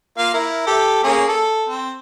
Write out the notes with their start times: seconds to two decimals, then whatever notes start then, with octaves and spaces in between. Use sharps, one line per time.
0.18 A#3 F4 F5
0.34 E4 A#4
0.67 G4 A4
1.04 A#3 C#4 G#4
1.28 A4
1.69 C4